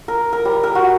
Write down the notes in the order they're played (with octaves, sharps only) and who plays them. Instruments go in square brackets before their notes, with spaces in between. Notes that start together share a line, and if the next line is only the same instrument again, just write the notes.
[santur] A#4
A#4
G3
A#4
F#4